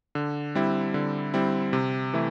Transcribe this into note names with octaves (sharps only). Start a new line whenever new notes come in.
D3
G3 C4 E4
D3
G3 C4 E4
C3
E3 A3 E4